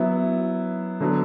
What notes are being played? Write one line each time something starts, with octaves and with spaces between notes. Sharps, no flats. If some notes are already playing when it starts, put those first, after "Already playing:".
Already playing: F#3 B3 E4
D3 F#3 B3